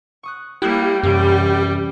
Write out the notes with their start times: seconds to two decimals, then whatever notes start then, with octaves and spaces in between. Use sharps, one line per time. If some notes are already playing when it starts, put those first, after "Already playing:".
0.23 C#6 D#6 F#6
0.62 G3 A#3 E4 G4 F#6
1.03 F#2 C3 E3 G3 C#4